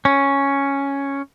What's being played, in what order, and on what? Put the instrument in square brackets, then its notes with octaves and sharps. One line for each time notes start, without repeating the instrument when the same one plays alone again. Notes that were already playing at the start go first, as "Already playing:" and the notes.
[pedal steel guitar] C#4